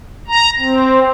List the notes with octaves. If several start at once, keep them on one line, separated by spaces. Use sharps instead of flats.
A#5
C4